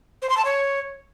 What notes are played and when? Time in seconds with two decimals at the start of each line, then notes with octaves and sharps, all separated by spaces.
0.22 C5
0.30 C6
0.37 A5
0.45 C#5